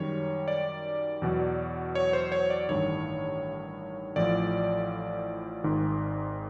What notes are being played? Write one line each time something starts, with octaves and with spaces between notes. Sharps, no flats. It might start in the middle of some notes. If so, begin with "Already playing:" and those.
Already playing: F#2 D#3 G3 C#5
D5
E2 B2 F#3
C#5
C5
C#5
D5
A1 G2 D#3 C#5
A1 A2 F3 D5
G#1 G#2 D#3